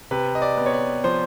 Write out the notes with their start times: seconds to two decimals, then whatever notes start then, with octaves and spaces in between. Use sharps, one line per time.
0.11 C3 B4
0.35 D#5
0.42 D5
0.57 B3
0.66 C#5
0.73 D5
1.04 F3 C5